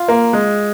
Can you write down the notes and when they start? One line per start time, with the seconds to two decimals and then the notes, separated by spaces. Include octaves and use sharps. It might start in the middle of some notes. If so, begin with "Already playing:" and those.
Already playing: F4
0.08 A#3
0.33 G#3